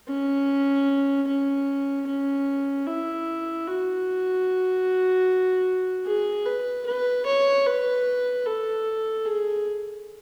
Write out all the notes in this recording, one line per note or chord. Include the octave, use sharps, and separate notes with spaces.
C#4
C#4
C#4
E4
F#4
G#4
B4
B4
C#5
B4
A4
G#4